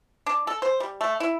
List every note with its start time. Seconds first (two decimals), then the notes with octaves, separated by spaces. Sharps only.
0.26 D4
0.47 A4
0.62 C5
0.80 G3
1.01 A3
1.20 E4